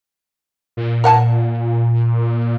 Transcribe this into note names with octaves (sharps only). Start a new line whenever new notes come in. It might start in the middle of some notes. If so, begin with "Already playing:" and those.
A#2
A#4 F#5 A5